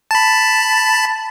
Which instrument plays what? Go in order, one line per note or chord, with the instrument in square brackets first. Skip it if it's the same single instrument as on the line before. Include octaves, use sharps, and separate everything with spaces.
[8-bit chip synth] A5 B5